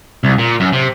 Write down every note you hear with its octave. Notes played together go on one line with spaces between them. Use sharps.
C2
A#2
F#2
C3